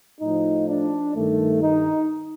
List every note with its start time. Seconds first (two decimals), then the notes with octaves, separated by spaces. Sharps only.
0.21 A2 F3 D#4
0.69 D4
1.15 G2 D#3 A3
1.62 D#4